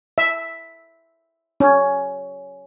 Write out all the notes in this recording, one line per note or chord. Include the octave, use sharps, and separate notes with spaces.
E5
C#4